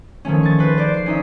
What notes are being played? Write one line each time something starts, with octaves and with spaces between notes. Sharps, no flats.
D#3 F3 A3 C#4
C#6 A6
B4 C5
C5 D5
C7
C#4 D#4 E5